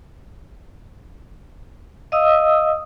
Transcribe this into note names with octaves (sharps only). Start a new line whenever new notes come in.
D#5 F5 D#6 E6